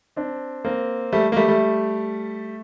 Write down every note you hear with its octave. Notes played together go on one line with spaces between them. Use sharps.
C4 D4
A#3 C4
G3 A3
A#3
G3 A3
G3 A3